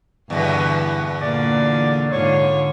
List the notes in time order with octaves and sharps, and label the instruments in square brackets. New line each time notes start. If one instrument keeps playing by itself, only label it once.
[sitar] E2 B2 [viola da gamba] G2 D3 B4
[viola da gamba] A#2 D3 [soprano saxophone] D5
[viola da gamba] G#2 D3 F4 [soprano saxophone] C#5